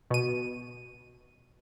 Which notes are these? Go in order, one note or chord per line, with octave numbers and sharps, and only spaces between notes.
B2 D#7